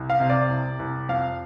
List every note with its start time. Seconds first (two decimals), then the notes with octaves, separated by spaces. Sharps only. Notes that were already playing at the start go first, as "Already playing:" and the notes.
Already playing: C2
0.10 F5
0.20 C3
0.29 D5
0.50 C2
0.79 C2
1.09 F2 F5